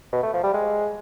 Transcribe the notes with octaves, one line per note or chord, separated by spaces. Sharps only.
B2
A3
F3
G3
G#3